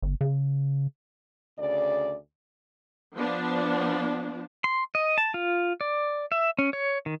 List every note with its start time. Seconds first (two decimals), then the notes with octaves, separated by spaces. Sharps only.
0.02 G1
0.21 C#3
1.58 D2 C#3 D5
3.15 F3 B3 D4
4.64 C6
4.95 D#5
5.18 A5
5.34 F4
5.81 D5
6.32 E5
6.59 C#4
6.73 C#5
7.06 D#3